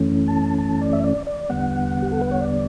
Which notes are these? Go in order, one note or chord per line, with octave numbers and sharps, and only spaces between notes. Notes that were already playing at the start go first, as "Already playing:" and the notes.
Already playing: F#2 E3 A3 C#4
A5
A5
D5
E5
D5
D5
E2 D3 G3 B3 F#5
G4
A4
B4
C#5
D5